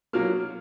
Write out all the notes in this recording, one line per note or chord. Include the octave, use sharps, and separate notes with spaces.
B2 F#3 A#3 F6